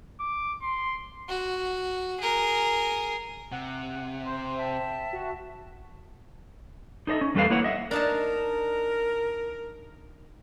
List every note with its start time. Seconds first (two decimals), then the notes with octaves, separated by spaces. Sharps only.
0.20 D6
0.62 C6
1.29 F#4
2.20 G#4 A#4
3.52 C3 F#5
4.26 C5 C6
4.57 E5 G5 A5
5.13 F#4
7.07 D#4 A4 C5 D#5 E5
7.21 C#4
7.35 E2 G3 A3 A4 B4 F5
7.50 A#3 E4 B4 C#5 F#5
7.64 D#5 E5 F#5
7.91 D4 D#4 A#4 A5